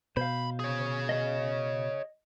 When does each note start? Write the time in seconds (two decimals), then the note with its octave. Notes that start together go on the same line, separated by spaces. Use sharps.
0.17 B2 C5 F5 B5
0.60 G#4 C#5
1.09 D#5